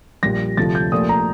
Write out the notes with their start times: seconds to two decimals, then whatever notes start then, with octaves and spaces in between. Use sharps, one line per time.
0.23 A#1 A#2 G3 A#6
0.57 D2 C3 F3 A3 A6
0.75 G6
0.92 A#1 A#2 A3 D#6
1.09 A#5